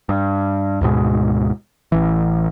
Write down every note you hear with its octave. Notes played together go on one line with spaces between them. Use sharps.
G2
D2 G#2 B2 G#3
A1 E3